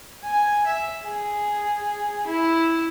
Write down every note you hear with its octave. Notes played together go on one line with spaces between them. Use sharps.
G#5
E5
G#4
E4